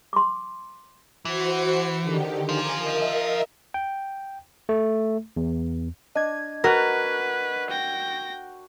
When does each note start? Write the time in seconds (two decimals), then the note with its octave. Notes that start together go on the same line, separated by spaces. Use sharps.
0.13 C6 D6
1.25 E3 F#4 C5 C#7
2.01 D3 D#3 G4
2.49 F4 C5 G#5 A#5 D6
2.78 A#4 D#5 E5
3.74 G5
4.69 A3
5.37 E2
6.15 D4 D#5 G#6
6.64 F#4 A#4 B4
7.70 G5 A#6